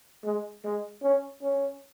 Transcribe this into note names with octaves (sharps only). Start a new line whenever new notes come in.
G#3
G#3
C#4
C#4